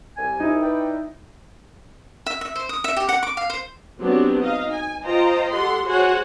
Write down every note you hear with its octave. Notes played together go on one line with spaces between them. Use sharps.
C2 G#5
D#4 E4
B4 D5 G5
E5
E5
C5
D#6
E5
G4
F#5
D6
F5
C5
F#3 B3 C4 D4 G4
D#4 D#5 F5
G#5
F4 C5 D#5 G5 A#5
G4 A4 F#5 C6
F#4 G#4 C5 C#5 F#5 G#5